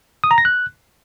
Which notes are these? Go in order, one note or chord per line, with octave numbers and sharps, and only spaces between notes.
D#6
A#5
A#6
F#6